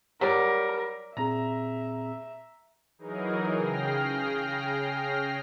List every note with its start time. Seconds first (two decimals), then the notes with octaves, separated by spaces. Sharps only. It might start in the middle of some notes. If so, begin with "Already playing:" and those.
0.21 F#3 G3 A#4 D5
1.17 A#2 C4 G#4 E5 A#5
2.98 E3 F#3 D#4 G#4 A#4
3.55 C#3 G#4 G5 F6 A#6 C7